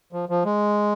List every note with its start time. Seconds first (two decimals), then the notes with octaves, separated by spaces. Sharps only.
0.12 F3
0.29 F3
0.45 G#3